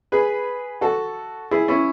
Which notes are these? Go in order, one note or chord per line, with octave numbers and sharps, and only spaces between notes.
G#4 B4
F#4 A4
E4 G#4
C#4 E4